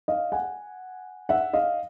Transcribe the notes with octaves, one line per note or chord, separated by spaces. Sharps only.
D#5 F5
F#5 G#5
E5 F#5
D#5 F5